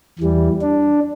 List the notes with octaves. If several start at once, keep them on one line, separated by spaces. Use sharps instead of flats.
E2 E3 G3
D4